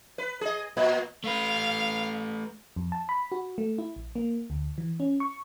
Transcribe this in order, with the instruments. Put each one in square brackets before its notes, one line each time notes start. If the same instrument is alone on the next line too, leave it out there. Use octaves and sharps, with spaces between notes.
[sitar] B4
G#4 D#5
A#2 B4
[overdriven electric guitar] A3 B4 [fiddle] F5
[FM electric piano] F2
A5
B5
F#4
A3
E4
A#1
A#3
D2
E3
C#4
C#6